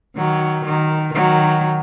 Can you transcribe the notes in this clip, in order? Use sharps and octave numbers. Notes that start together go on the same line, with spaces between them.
D#3 F#3
D#3
D#3 F#3